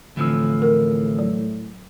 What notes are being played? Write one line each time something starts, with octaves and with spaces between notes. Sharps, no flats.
A2 D3 E3 F3 C4 E6
A#4
F#3